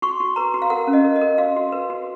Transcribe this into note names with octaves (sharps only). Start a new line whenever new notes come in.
F#4 C#6
F#4
B4 A#5
F#4
F5
A#4 F#5
C#4
D#5
A#4
D#5
A#4
F#4 F5
F#4
B4
F#4